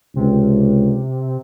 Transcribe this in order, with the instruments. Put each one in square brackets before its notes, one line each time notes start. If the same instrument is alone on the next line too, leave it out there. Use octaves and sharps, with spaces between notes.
[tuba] C#2 [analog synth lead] C3